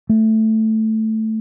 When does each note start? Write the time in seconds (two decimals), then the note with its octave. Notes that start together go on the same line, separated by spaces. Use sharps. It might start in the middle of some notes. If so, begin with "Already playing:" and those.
0.09 A3